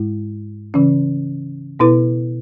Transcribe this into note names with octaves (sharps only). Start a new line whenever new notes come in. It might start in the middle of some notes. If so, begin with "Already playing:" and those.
Already playing: G#2 G#3 E4
C#3 E3 C#4
B2 B3 E4 B4